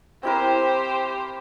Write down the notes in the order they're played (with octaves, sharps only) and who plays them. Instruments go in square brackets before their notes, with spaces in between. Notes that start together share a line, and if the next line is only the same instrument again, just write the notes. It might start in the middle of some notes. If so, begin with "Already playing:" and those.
[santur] C4 E4 A#4 [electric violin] G4 C5